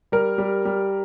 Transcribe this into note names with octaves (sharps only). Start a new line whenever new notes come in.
G3 A#4
G3
G3